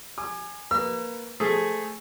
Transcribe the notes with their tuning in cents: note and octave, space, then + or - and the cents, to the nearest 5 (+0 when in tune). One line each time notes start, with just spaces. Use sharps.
G#5 +0 D6 +40
A#3 +0 B4 +0 E6 +40
A3 +0 G#4 +0 C5 +0